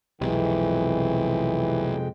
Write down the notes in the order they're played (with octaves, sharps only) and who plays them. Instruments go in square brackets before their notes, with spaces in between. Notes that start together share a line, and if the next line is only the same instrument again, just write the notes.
[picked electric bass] B1 [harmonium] F2 G#3 G5 [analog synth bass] C3 [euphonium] E3